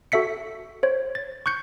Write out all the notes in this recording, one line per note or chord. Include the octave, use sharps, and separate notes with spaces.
F#4 A4 E5 B6 C#7
C5 C#5
A6
C#6 F#6 G6 C#7